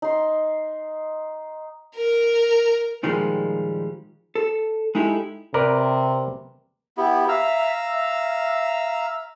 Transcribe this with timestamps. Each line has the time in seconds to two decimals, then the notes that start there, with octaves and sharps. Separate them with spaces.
0.02 D#4 C6
1.95 A#4
3.03 A#2 D#3 F3 G3 G#3 A#3
4.35 A4
4.95 G#3 D#4 E4 G4 A4
5.54 C3 A#4 B4 D5
6.97 B3 E4 G4
7.29 E5 F5 A#5 E6
7.93 E5